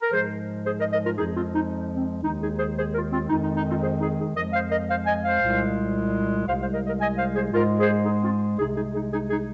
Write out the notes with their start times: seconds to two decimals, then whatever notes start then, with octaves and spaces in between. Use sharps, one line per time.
0.01 A#4
0.12 G#2 F3 G#3 G#4 C5
0.65 G#4 C5
0.78 A#4 D#5
0.91 A#4 D#5
1.05 F4 A#4
1.17 F2 F3 G#3 D#4 G#4
1.35 C4 F4
1.54 D#4
1.97 C4
2.23 D#2 D#3 G#3 D#4
2.41 D#4 G#4
2.59 G#4 C5
2.77 G#4 C5
2.94 F4 A#4
3.11 C4 F4
3.29 F2 D#3 G#3 D#4
3.43 D#4
3.56 D#4
3.69 C4 F4
3.82 G#4 C5
4.00 D#4 G#4
4.18 D#4 G#4
4.35 F2 F3 G#3 A#4 D#5
4.53 C5 F5
4.70 A#4 D#5
4.89 C5 F5
5.06 D#5 G#5
5.23 C5 F5
5.41 C2 A#2 G#3
6.47 C2 C3 G#3 C5 F5
6.60 C5 F5
6.73 A#4 D#5
6.87 A#4 D#5
7.00 D#5 G#5
7.17 C5 F5
7.35 G#4 C5
7.53 G#2 G#3 F4 A#4
7.80 G#4 C5
8.05 D#4 G#4
8.23 C4 F4
8.58 C2 C3 G#3 D#4 G#4
8.76 D#4 G#4
8.94 D#4 G#4
9.12 D#4 G#4
9.30 D#4 G#4